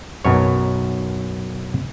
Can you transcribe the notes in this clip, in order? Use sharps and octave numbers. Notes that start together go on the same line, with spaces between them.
B1 F#2 C#5